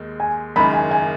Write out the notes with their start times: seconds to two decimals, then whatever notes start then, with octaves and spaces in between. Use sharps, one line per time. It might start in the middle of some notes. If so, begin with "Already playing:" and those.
Already playing: D#2 D#3 G#3
0.20 G#5
0.56 F#1 F#2 D#3 G#3 B5
0.74 G#5
0.91 G#5